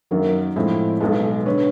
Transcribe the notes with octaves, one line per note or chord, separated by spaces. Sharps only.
F#2 D#3 F#3 A#3 A#4
A2 F3 G#3 C4 E4
B1 B2 G#3 A4 B4
D3 B4 C#5